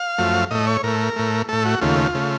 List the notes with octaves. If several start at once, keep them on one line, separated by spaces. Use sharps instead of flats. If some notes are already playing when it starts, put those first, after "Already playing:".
Already playing: F5
F#2 F3 A3
A2 A3 D#5
C#5
A2 A3 A#4
A2 A3
A2 A3 A4
F#4
D#2 C#3 A3 F4
C#3 A3